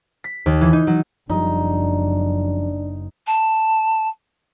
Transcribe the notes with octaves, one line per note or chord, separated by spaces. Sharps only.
B6
D#2
E3
D#4
F#3
F#1 F#2 F3 G3 D4 D#4
A5